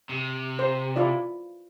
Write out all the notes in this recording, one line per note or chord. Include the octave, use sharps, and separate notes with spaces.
C3
C5
E4 F4 D5